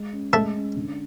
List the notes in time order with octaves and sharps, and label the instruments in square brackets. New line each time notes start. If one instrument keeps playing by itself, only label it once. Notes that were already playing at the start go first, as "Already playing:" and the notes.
Already playing: [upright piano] G#3
C#4
[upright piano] G#3 [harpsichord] A3 A4
[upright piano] C#4
D3